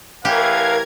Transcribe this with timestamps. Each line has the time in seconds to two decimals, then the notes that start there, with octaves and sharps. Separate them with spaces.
0.25 A2 E3 G4 A#4 F5 G#6